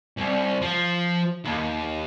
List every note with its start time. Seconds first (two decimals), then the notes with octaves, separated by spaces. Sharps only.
0.17 C2
0.62 F3
1.45 D#2